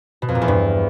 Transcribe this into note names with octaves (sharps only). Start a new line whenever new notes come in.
B2
F2
A#2
E2
G2